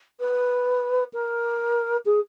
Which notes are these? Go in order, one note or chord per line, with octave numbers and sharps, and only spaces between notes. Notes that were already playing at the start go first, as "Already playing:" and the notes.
B4
A#4
G#4